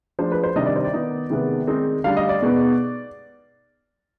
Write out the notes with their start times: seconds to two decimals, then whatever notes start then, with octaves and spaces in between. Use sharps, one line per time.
0.19 F3 G#3 D4 C5
0.32 B4
0.43 C5
0.56 C3 D#3 G3 D4 D#5
0.66 D5
0.76 C5
0.84 D5
0.94 D#3 B3 D#4
1.30 C3 D#3 G#3 B3
1.67 D#3 G#3 C4 D#4
2.04 D3 G3 D4 F5
2.17 D#5
2.29 D5
2.42 B2 G#3 B3 D#4